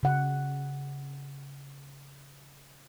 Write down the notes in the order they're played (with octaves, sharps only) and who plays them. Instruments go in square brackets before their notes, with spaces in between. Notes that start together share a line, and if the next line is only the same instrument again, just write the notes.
[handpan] C#3 F#5